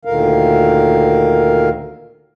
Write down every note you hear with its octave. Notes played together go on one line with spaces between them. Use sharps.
D2 A#2 D3 D#3 A#4 F5